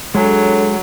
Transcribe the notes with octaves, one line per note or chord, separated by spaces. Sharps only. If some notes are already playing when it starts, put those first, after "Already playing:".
F#3 G#3 D4 G#4 A4 C#5